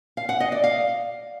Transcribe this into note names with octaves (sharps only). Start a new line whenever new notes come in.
F5
F#5
D#5
D5
F5